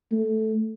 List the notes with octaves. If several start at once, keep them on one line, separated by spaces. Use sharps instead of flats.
A3